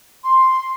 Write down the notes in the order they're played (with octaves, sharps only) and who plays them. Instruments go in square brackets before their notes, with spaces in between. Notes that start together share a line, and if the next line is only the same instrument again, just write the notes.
[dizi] C6